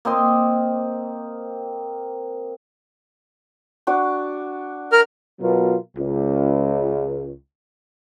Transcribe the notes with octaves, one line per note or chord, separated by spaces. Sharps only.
A#3 C4 D#5 C6
D4 F#4 D5
A#4 F6
B2 F#3 B3 F4 A#4
C#2